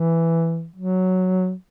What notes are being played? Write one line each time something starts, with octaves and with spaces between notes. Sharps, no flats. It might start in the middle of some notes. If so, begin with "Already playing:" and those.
Already playing: E3
F#3